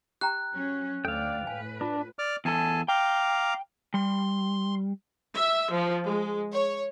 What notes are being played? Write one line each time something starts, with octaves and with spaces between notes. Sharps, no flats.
G4 G5 A#5 F#6
F#3 C#4
D2 A4 D5 F5 G5
A2 B4 G#5
D4 F4
D5 D6 F6
E2 A4 G#5 A5
F5 G5 A#5 D6
G3 C6
E5
F3
G#3
C#5